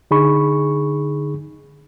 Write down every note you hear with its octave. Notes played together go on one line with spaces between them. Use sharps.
D3 D#4 G#4 B5 C#6